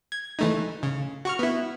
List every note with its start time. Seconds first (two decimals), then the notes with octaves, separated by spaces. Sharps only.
0.12 G#6
0.39 E3 A3 D#4
0.83 C#3
1.25 F#4 C#6 F6
1.39 B3 E4